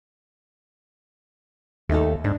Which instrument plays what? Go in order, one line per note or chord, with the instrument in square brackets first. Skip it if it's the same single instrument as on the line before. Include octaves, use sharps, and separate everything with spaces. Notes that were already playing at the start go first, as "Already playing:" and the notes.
[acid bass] D#2 [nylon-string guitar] A3 D#4 A4
[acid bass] G#2 [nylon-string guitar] D4